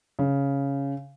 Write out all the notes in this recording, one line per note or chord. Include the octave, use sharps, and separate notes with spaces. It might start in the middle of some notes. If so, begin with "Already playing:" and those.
C#3